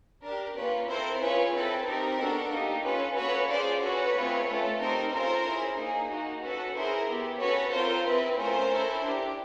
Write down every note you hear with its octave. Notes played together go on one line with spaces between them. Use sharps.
D4 G4 A#4
A#3 C#4 F4 B4
C4 E4 A4 A#4 C5
C#4 F4 G#4 B4 C#5
C4 E4 A4 B4
C4 D#4 G4 A#4
B3 D4 F#4 A4
A#3 D#4 G4
C#4 F4 A4 B4
A#3 C#4 F#4 A4 B4 C#5
C#4 F4 G#4 C5 D5
C#4 F#4 A4 B4 C#5
A3 C4 F4 G#4
A3 C#4 F4 A4
C4 D#4 G4 A#4 C5
C#4 F4 A4 A#4 C5
C#4 E4 G#4
A#3 D#4 G#4
A#3 D#4 F#4
C#4 F#4 A4 B4
C#4 E4 G#4 A#4 C5
B3 E4 G4
C#4 F#4 A4 B4 C#5
C4 F4 A4 A#4 C5
C4 E4 G#4 B4
A3 C#4 F4 A#4 C5
C#4 E4 A4
D4 G4